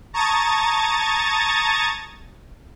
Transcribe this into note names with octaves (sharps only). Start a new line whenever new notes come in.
A5 A#5 C#6 D#6 G#6 A6